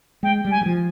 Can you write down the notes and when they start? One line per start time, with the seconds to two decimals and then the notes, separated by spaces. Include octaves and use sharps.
0.23 G#3 G5
0.45 G3
0.51 G#5
0.61 G3
0.66 F3